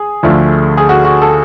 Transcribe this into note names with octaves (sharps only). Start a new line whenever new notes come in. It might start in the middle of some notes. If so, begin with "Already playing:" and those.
Already playing: G#4
D2 D3 F3 A3
G#4
F#4
F#4
A4